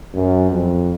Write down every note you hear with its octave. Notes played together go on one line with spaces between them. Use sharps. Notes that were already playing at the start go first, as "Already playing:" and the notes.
F#2
F2